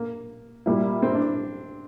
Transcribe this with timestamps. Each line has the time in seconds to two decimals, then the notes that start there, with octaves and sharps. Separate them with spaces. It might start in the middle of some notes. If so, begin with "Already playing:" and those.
Already playing: A#3
0.66 A#2 G3 A#3 E4
1.02 C4
1.15 D4